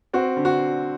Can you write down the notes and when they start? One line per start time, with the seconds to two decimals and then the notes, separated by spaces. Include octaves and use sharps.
0.13 C4 F#4
0.37 D3
0.45 F#4